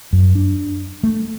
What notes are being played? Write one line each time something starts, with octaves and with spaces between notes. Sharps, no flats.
F#2
D4
A3